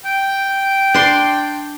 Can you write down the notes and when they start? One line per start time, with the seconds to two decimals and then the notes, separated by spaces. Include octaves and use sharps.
0.04 G5
0.94 D4 C6